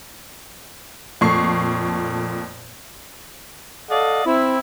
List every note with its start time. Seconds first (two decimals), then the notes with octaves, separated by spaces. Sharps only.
1.21 F2 A#2 A3 C#6 C7
3.90 A4 D5 D#5 F5 F#5
4.26 C4 E4